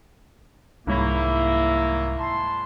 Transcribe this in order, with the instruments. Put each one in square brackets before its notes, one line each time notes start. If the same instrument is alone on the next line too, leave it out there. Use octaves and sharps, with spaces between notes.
[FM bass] C2 [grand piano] G#2 C#5 B5 [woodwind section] D#3 F#3 A#3 [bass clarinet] E4
[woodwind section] A5 C6